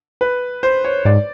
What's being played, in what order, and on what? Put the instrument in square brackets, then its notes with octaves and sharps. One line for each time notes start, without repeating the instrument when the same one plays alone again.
[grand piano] B4
C5
C#5
[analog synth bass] G#2 [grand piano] D5